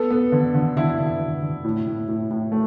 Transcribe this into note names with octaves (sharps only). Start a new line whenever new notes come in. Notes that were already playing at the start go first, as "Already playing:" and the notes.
Already playing: B3 A4
B3
D3
D3
D3 E4
D3
D3
D3
A2
A2
A2
A2
A3